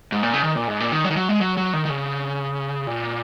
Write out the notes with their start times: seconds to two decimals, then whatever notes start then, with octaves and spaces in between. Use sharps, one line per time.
0.12 G#2
0.23 A#2
0.34 C#3
0.44 D#3
0.56 A#2
0.68 G#2
0.80 A#2
0.92 D#3
1.04 F#3
1.10 D#3
1.16 F#3
1.29 G#3
1.41 F#3
1.57 F#3
1.73 D#3
1.85 D#3
1.89 C#3
2.87 A#2